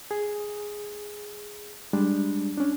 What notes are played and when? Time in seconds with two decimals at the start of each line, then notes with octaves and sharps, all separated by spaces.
0.11 G#4
1.93 G3 G#3 D4
2.58 C#4 D4